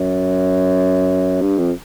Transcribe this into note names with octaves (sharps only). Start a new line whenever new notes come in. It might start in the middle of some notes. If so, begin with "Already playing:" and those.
Already playing: F#2
G2
F2